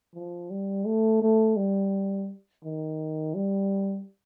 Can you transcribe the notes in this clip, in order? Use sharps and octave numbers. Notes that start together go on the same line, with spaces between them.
F3
G3
A3
A3
G3
D#3
G3